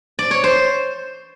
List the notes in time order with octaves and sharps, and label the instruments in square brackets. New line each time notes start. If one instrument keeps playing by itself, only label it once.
[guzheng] D5
C#5
C5